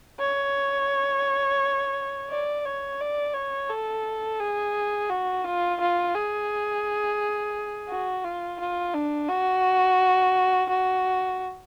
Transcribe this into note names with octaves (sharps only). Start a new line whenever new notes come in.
C#5
D5
C#5
D5
C#5
A4
G#4
F#4
F4
F4
G#4
F#4
F4
F4
D4
F#4
F#4